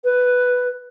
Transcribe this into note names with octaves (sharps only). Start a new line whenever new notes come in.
B4